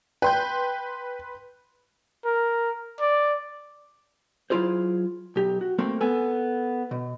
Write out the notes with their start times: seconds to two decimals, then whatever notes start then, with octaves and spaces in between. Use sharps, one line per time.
0.22 B4 G5 C6 G6
2.25 A#4
3.00 D5
4.50 F#3 E4 F4 G#4 C5
5.36 B1 G4
5.61 F#4
5.79 A3 A#3 C4
6.01 B3 A4 G#5
6.91 B2